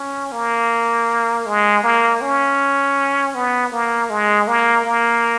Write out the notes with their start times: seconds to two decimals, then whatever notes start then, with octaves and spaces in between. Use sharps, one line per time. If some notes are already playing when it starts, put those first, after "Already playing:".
Already playing: C#4
0.32 A#3
1.46 G#3
1.83 A#3
2.21 C#4
3.35 B3
3.72 A#3
4.10 G#3
4.48 A#3
4.85 A#3